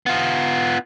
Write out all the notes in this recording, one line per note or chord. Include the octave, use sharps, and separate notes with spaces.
B3 F4